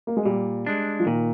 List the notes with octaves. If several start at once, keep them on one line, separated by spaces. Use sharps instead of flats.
A#3
G#3
A#2 G3
G#3 D4
F3
A#2 D#3